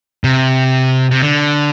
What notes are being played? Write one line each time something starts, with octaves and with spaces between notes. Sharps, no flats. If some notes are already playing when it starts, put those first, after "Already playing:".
C3
C3
D3